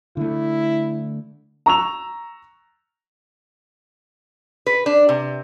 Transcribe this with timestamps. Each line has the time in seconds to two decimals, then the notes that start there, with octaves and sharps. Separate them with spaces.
0.17 D3 A3 E4
1.66 A#5 C#6 E6 F7
4.67 B4
4.86 D4
5.09 C3